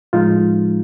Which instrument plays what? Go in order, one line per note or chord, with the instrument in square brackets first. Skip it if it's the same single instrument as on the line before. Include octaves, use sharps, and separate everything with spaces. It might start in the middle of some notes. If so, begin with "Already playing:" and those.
[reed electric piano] A2 F3 G#3 D#4 F4